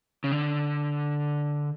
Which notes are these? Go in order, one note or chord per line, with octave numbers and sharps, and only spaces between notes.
C#3
D3